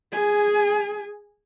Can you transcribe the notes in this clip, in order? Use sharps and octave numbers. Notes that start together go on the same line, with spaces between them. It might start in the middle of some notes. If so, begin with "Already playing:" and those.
G#4 G#5